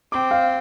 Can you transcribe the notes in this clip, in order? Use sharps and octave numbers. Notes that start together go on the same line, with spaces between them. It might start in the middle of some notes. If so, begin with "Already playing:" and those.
C4 D6
F5